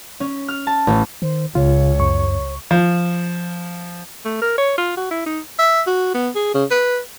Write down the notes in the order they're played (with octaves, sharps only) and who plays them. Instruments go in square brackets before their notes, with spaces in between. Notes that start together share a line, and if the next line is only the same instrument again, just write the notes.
[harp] C#4
F6
A5
A1
[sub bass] D#3 [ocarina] C5
[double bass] C#2 [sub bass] C#3 [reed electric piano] F4 [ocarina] C#5
[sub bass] F#2 [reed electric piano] C#6
[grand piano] F3
[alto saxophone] A3
A#4
C#5
F4
F#4
E4
D#4
[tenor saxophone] E5
F#4
B3
G#4
C#3
B4